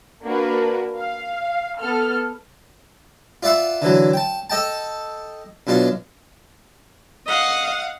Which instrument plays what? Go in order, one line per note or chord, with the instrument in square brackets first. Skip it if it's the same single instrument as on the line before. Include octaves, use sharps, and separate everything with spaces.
[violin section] A#3 D4 F#4 A#4 B4
F5
B3 A4 F6
[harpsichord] F4 D5 E5 F#5 C6
D3 E3 F#3
G5 A5
A4 D#5 G5 A5
F#2 B2 D4 F4
[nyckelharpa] D#5 [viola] F5 F#5